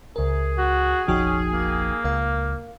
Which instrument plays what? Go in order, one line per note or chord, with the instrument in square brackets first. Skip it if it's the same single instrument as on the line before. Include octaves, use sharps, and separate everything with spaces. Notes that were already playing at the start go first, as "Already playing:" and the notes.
[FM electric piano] C#2 A#4 [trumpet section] G#4
[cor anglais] F#4
[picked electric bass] F1 A#1 F3 [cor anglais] C#4 [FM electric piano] D#4 F#4 G5
[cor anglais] A#3
[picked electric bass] C#2 [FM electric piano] A#4 F5